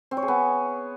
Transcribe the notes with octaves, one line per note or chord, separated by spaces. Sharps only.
C4
C#5
G#4
B3